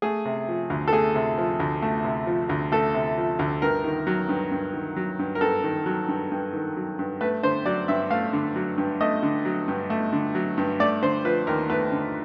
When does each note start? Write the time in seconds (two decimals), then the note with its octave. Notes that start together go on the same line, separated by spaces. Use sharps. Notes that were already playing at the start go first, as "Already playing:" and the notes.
0.02 A3 G#4
0.25 C3
0.48 F3
0.70 D2
0.88 A4
0.93 A3 G#4
1.15 C3
1.38 F3
1.60 D2
1.82 A3
2.04 C3
2.27 F3
2.49 D2
2.72 A3 A4
2.94 C3
3.17 F3
3.39 D2
3.62 G2 A#4
3.84 D#3
4.07 F#3
4.29 G2
4.52 G2
4.74 D#3
4.96 F#3
5.19 G2
5.35 A#4
5.41 G2 A4
5.64 D#3
5.86 F#3
6.08 G2
6.32 G2
6.53 D#3
6.76 F#3
6.99 G2
7.21 A3 B4
7.43 D3 C5
7.66 F#3 D5
7.88 G2 E5
8.10 A3 F5
8.33 D3
8.56 F#3
8.78 G2
9.01 A3 D#5
9.23 D3
9.45 F#3
9.68 G2
9.90 A3
10.13 D3
10.35 F#3
10.57 G2
10.80 A3 D5
11.02 D3 C5
11.25 F3 B4
11.47 D#2 A#4
11.70 A3 B4
11.92 D3